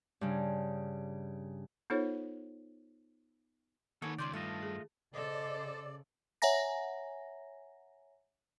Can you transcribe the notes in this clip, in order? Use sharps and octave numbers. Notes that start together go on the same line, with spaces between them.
G2 C#3
B3 D#4 F4 A4 C5 C#5
D#3 A#3 D#4 A4 B4 C#5 F#5 G#5
C#2 C#4 D5 C6 G6
G2 A3 F4 D#5 A5
G#4
C#3 A4 C5 D5 D#5
C#5 E5 F#5 G#5 A#5 A#6